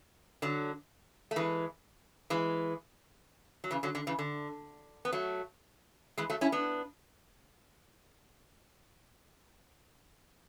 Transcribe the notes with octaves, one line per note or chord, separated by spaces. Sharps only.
D3 F#3
A3
E3 G#3
E3 G#3
F#3
C#3 E3
D3 F#3
D3
C#3 E3
D3
B3
F#3 A3
E3 G#3
F#3 A3
C#4 E4
B3 D4